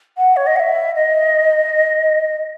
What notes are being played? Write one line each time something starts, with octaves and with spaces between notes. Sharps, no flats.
F#5
C#5
D#5
F#5
E5
D#5